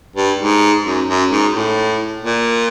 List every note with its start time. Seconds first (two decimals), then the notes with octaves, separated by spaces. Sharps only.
0.16 G2
0.39 G#2
0.85 F#2
1.08 F#2
1.31 G#2
1.54 A2
2.23 A#2